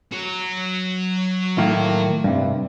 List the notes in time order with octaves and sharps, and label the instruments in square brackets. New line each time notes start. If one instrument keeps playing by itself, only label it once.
[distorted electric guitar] F#3 F#4
[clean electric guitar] A2 D#3 A#3
G2 C3